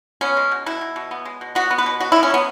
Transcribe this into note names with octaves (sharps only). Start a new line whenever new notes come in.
B3 C#4
G#3
B2
B2 E4
B2
B2
B3
G#3
B2
B3 F#4
B3
B4
B2
B3 F#4
E4
B3
C#4
F#3 B3